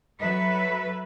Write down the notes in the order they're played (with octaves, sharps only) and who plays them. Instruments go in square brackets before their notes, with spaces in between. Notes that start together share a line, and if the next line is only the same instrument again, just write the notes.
[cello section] F#3 A4 B4 E5